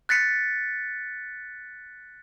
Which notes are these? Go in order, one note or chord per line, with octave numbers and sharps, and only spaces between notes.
F#6 A6 B6 C#7